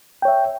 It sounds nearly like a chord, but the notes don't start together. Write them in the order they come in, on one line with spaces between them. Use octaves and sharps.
G5 C#5 E5